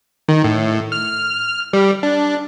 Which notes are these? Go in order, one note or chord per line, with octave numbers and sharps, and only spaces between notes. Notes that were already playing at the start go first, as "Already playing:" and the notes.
D#3
A2
F6
G3
D4